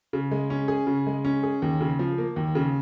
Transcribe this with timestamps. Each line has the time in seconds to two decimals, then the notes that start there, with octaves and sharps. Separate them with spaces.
0.13 C#3
0.31 G#3
0.50 C#4
0.68 G#4
0.87 C#3
1.07 G#3
1.25 C#4
1.43 G#4
1.62 D#2
1.80 C#3
1.99 F3
2.18 A#3
2.36 D#2
2.55 C#3